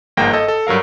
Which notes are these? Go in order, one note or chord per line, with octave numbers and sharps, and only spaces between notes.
G1 G#2 F3 A#3 G5 A#6
A4 D#5
A4
G2 F#3 A#4 F5